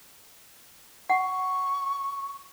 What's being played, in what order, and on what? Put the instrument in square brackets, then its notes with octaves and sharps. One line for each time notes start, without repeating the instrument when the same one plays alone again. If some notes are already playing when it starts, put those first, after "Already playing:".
[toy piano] F#5 [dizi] C#6